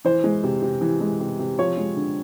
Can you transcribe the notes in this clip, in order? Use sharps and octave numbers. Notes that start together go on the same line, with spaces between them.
E3 C5
G#3
C3
C3
E3
G#3
C3
C3
F3 C#5
G#3
D3